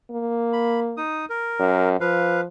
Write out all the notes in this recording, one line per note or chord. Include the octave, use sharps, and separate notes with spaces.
A#3
B5
D#4 D#6
A#4
F#2
F3 B4 F5